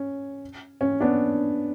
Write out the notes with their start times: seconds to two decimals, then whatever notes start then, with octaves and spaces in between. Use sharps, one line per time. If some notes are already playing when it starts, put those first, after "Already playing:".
Already playing: C#4
0.81 C#4
1.01 B3 D4